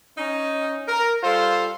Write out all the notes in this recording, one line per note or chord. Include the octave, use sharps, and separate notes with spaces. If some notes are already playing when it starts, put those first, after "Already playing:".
C#4 D#4
A#4
G3 F4 A4 C5